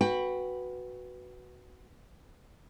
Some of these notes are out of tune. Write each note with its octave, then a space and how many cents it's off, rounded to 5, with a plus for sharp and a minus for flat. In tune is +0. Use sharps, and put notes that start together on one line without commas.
F#4 +0 B4 +0 G5 +20